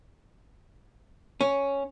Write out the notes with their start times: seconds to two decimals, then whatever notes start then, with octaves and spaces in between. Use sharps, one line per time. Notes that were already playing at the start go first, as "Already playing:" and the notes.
1.41 C#4